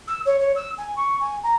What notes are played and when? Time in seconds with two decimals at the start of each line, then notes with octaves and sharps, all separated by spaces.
0.07 E6
0.25 C#5
0.39 C#5
0.55 E6
0.77 G#5
0.96 C#6
1.20 G#5
1.43 A#5